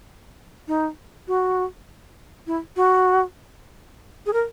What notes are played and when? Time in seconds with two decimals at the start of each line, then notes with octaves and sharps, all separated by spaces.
0.68 D#4
1.28 F#4
2.47 E4
2.76 F#4
4.26 G#4
4.33 A#4